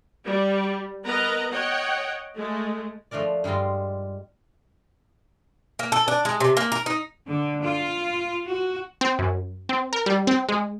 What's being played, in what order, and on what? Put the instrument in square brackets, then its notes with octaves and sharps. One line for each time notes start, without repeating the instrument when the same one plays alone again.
[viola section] G3
B3 A#4 B4 D#5 A#5
C#5 D#5 F#5 G5
G#3 A3
[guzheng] F3 A3 D4 A#4 D5
G2 G3 G#3 F4 D#5
[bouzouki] A#3
A4
D4
G#3
C3
A#3
A#4
D#4
[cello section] D3
F4
F#4
[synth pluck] C4
F#2
C4
A#4
G3
C4
G#3